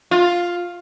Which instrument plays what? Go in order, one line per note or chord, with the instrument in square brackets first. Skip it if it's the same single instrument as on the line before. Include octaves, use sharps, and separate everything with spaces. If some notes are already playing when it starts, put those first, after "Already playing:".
[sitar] F4